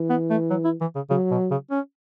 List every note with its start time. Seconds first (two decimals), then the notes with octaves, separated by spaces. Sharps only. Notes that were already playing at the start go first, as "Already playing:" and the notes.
Already playing: E3
0.10 B3
0.30 A3
0.50 F#3
0.65 E4
0.81 E3
0.95 C#3
1.10 C#3 F#3
1.31 B2
1.51 C#3
1.71 C#4